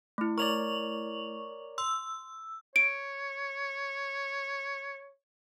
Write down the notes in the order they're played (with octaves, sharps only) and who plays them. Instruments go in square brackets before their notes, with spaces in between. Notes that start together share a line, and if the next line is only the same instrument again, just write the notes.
[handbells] A3 E4
[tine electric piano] A#4 C#5 D5 [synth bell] C#6 F7 F#7
[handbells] C6 [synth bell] E6
[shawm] C#5 [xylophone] D7